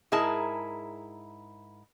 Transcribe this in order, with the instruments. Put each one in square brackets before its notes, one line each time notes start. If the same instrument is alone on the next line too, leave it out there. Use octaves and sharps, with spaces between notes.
[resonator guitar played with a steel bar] G#2 E4 G#4 A#4 A5